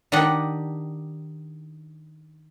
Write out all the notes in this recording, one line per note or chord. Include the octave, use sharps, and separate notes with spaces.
D#3 D4 G4 D#5 F#5